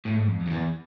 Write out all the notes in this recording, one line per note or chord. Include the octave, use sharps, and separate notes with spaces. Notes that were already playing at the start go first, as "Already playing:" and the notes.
A2
G#2
F2
E2
F2
E2